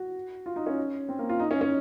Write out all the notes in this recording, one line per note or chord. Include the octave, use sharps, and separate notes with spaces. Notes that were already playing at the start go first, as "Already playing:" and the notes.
Already playing: F#4
F4
D#4
C#4
C4
A#3
F4
D#4
C#4
C#4